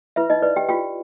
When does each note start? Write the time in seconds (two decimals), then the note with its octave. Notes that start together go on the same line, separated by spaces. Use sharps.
0.16 E4 B4 E5
0.30 D#4 D#5
0.42 B4 D5
0.56 G4 G5
0.69 F4 G4 G5